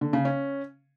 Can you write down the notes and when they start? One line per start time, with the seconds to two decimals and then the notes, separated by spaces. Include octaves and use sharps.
0.01 D3
0.13 C#3
0.25 C#4